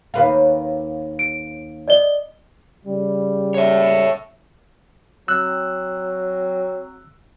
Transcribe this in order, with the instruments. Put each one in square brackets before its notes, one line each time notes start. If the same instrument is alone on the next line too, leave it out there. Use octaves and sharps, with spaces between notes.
[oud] D#2 B4 F5
[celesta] D7
D5 D#5 G7
[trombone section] C#3 G3
[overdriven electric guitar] C#5 E5
[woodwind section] F#3 C4 [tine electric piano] E6 F#6